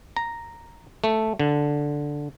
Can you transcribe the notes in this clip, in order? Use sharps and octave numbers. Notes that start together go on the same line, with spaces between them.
A#5
A3
D3